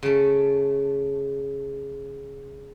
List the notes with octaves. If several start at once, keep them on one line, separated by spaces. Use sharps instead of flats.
C#3 A3